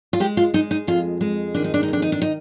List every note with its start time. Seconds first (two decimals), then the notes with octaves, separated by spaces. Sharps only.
0.13 F4
0.20 G#3 G4
0.37 F4
0.54 G#3 D#4
0.71 D#4
0.87 F2 F4
1.21 G#3
1.54 D#3 D4
1.64 D#4
1.74 D4
1.83 D#4
1.88 F2
1.93 D4
2.02 D#4
2.12 D4
2.22 D#4